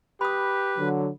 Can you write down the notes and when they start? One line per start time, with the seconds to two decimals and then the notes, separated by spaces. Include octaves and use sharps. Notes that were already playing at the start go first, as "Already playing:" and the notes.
0.21 G4 B4 B5 D#6
0.76 D3 F#3